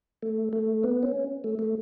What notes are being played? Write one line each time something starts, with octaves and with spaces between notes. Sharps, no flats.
A3
A3
B3
C#4
A3
A3